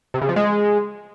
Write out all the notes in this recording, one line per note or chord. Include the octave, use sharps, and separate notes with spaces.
C3
C#3
F3
G#3